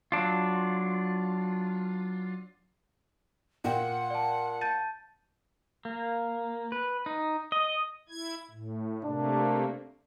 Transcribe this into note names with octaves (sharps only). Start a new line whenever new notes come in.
F#3 D4 F4
A#2 F#5 G5
D5 A5
A5 G6 A6 D#7
A#3
B4
D#4
D#5
E4 G#6
A2
C3 A3 A#3 D4